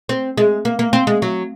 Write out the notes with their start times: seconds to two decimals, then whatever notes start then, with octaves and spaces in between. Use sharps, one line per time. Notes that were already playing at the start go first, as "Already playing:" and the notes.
0.09 C4
0.38 G#3
0.65 A#3
0.79 A#3
0.93 C4
1.07 G#3
1.22 F#3